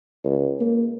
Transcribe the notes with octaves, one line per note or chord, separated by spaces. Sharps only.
C#2
A#3